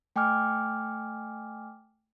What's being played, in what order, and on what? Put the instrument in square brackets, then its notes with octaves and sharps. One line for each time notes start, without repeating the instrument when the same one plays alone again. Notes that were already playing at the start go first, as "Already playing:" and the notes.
[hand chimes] A3 G5 G#5 D6 F6